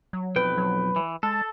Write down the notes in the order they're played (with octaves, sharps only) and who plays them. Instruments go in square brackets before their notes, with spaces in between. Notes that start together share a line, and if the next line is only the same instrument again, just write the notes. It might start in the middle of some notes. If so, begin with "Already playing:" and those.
[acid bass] F#3
[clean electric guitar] B1 F2 G5 [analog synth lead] B4
[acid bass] F#3
[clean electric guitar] E3
[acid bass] G#3 [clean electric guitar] A4 [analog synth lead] A5